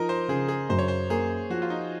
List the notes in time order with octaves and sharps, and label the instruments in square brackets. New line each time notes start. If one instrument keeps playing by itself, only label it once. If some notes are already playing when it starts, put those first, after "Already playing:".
Already playing: [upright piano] F3 [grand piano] D#4 A#4
[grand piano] C5
[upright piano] C#3 [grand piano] G#4
[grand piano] G#4
[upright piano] F#2 [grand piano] C5
[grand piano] C#5
C5
[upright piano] A#3 [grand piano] G#4
[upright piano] F3 [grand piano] F#4
[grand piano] F4
D#4